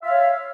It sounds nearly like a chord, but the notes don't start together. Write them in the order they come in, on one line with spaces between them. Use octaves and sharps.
E5 F5 C#5